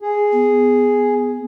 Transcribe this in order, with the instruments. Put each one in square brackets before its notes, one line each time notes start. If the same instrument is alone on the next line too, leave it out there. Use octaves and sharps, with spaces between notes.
[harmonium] G#4
[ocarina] B3